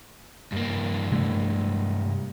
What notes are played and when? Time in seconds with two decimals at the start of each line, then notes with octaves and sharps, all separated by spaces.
0.52 G2 A#3
1.11 C3 G#3 A3